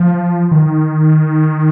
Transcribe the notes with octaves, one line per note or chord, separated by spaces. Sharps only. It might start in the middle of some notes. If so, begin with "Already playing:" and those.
Already playing: F3
D#3